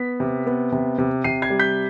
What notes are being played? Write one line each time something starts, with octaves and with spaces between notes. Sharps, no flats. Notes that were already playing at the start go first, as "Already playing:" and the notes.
Already playing: B3 B6
C3
B3
C3
C3
C3 C7 D#7
G#6 C7
G3
G6 B6